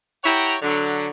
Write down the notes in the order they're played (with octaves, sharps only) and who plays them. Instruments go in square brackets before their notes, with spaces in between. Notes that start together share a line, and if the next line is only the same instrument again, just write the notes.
[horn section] E4 G4 C#5 F#5 G5 A#5
D3 F#3